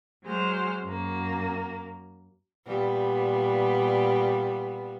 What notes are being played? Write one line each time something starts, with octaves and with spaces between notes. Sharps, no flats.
F#3 G#3 C5 F6
F#2 A#3
A#2 G3 B3